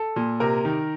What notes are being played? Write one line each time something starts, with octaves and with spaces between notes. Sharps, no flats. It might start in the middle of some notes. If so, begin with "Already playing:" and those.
Already playing: A4
A#2
C3 A#4
D#3